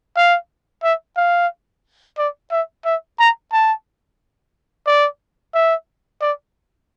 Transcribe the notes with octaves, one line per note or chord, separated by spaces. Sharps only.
F5
E5
F5
D5
E5
E5
A#5
A5
D5
E5
D5